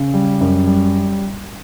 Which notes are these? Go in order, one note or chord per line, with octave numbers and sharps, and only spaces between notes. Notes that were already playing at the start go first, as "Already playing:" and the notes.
Already playing: C#3
G3
F#2
G3